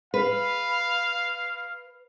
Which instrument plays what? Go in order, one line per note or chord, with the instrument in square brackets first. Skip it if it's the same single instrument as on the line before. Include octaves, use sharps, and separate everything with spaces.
[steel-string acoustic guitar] B4 [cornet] F5